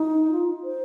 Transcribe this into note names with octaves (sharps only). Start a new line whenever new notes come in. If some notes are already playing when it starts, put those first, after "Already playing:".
Already playing: D#4
F4
C5